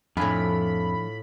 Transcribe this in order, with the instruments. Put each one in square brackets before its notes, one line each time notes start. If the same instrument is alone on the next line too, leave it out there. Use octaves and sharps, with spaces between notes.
[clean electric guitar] F2 [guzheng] A2 F4 [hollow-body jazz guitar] F3 D4 G#5 [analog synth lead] B5